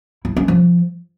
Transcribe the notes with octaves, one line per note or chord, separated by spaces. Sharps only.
E4
C#4
F3